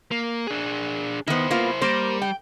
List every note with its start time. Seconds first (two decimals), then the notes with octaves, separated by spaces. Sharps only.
0.11 A#3
0.47 D4 G#4
1.28 D#3 B3 E4 C5
1.50 A#3 B3 F4
1.82 G3 A#3 A#4 C5
2.22 G5